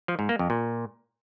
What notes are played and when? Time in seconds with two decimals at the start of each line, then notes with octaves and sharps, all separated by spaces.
0.08 F3
0.19 G#2
0.29 A#3
0.39 F2
0.50 A#2